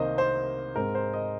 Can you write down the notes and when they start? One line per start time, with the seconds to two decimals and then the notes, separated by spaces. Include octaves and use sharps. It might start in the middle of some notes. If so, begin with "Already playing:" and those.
Already playing: C2 C3 D#3 A#3 C5 D#5
0.18 C5
0.76 G#2 G#3 C4 A#4
0.95 C5
1.13 D#5